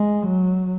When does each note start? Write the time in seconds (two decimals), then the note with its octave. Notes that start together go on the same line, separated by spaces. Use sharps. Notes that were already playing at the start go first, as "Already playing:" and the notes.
Already playing: G#3
0.27 F#3